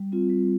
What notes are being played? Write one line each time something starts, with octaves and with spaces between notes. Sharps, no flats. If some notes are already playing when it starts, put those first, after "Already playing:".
Already playing: G3
C4 F4
G3